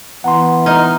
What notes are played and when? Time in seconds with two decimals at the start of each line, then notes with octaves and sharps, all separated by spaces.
0.24 E3 B3 F#5 A#5 C6
0.66 D#4 F6